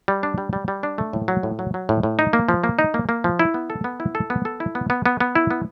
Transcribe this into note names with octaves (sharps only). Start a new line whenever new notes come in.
G3
D4
G3
G3
G3
D4
A3
A2
F#3
A2
F#3
F#3
A2
A2
D#4
A#3
F3
A#3
D#4
A#3
A#3
F3
E4
B3
A4
B3
E4
A4
B3
A4
E4
B3
B3
B3
B3
E4
B3